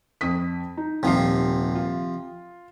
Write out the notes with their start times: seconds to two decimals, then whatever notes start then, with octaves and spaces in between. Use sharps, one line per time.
0.21 F2 D#6 B6
0.77 D#4
1.03 D#1 C3 F3 F4 C7
1.75 F4